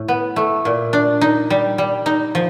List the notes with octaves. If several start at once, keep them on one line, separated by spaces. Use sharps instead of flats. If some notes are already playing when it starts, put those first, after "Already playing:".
Already playing: A2
B3
A3
A#2
D4
D#4
G3
G3
D#4
F3